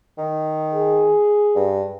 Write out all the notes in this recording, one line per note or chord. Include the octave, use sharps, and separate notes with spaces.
D#3
G#4
G2